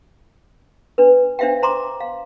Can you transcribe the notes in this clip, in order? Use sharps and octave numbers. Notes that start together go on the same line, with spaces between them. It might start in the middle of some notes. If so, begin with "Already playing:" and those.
D4 B4
D4 C5 E5 F5 G5
C5 A#5 C6 D6
F5